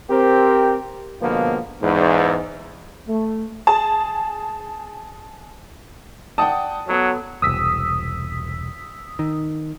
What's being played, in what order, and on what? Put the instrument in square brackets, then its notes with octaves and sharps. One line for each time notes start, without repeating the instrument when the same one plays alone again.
[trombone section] C4 G4 A#4
B2 D3 F3 G#3 A#3 B3
E2 G#2
[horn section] A3
[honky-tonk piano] G#4 A5
[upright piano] D5 F#5 G5 [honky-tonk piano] A5 D#6
[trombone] F#3 [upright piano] B3 F#4 A4
[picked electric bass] E1 C2 [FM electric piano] D#6 E6 B6
[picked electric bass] D#3